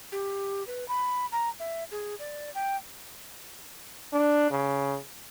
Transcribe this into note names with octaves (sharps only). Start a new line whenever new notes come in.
G4
B4
B5
A#5
E5
G#4
D5
G5
D4
C#3